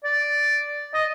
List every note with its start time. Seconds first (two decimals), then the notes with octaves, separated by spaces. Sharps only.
0.04 D5
0.94 D#5